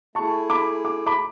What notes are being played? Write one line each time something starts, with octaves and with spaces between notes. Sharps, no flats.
A3 E4 G#4 A5 C#6
B5 D6
D6
B5 D6